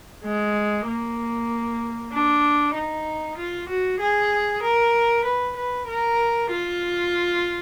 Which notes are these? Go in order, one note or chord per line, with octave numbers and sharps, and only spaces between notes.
G#3
A#3
D4
D#4
F4
F#4
G#4
A#4
B4
B4
A#4
F4